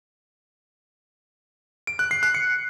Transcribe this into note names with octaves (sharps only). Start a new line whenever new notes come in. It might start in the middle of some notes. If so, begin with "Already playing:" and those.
D7
F#6
C7
F#6
C#7